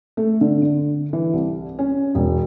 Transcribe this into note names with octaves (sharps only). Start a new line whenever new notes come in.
A3
D3
D3
E3
C2
C#4
E1